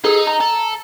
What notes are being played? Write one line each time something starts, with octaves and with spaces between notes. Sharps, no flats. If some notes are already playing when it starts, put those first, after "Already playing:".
D#4 G#4 A4
A#5
A4